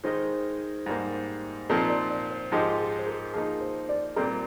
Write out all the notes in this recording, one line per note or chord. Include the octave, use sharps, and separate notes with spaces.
D#3 G#3 D#4 A#4 C5 D#5
G#2 G3 A#3
A#2 F3 C4 D#4 A#4
D5
D5
C5
G#2 F3 G#3 D#4 G4 A#4
G#4
C5
A#4
F3 A#3 D#4 G#4
C5
D5
A#2 G3 C4 A#4